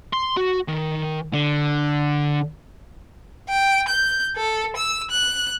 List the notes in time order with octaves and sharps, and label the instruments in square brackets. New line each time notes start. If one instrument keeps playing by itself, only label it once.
[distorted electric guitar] C6
F#4
D#3
D3
[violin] G5
G6
A4
E6
F#6